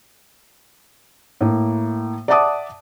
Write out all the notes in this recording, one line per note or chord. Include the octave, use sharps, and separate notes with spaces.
A2 A#3
D5 E5 F#5 A5 D6 D#6